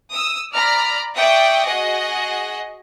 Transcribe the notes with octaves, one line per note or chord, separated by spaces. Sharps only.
D#6 E6
D5 A#5 B5 F6
D5 E5 G5 C#6 D#6
F#4 G#4 D#5